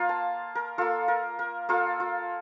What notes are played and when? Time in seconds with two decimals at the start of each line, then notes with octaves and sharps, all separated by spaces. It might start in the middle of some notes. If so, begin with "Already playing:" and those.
Already playing: A#3 F4 C6
0.09 A5
0.55 A#4
0.78 A#3 F4 A4
1.08 A#4
1.39 A#4
1.69 A#3 F4 A4
2.00 F4